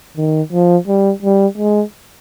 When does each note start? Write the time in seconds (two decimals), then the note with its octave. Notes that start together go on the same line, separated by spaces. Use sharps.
0.17 D#3
0.53 F3
0.88 G3
1.23 G3
1.58 G#3